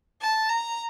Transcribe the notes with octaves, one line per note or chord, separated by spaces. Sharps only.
A5
A#5